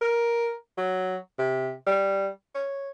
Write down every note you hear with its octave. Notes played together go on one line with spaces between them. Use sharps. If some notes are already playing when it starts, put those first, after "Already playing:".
A#4
F#3
C3
G3
C#5